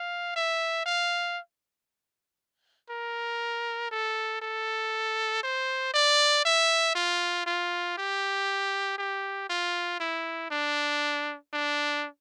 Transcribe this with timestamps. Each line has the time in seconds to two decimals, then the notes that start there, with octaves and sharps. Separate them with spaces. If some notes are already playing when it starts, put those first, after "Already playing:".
Already playing: F5
0.36 E5
0.86 F5
2.90 A#4
3.91 A4
4.42 A4
5.43 C5
5.94 D5
6.45 E5
6.95 F4
7.46 F4
7.98 G4
8.98 G4
9.49 F4
10.00 E4
10.51 D4
11.53 D4